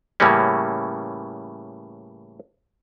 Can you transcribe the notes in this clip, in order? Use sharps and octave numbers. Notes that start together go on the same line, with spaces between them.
A2 C#3 E3 G3 A#3 C#4